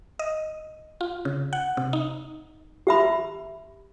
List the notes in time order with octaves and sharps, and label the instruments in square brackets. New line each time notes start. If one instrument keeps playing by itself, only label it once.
[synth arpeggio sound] D#5
F4
C#3
F#5
C3
D#4
[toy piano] G4 E5 B5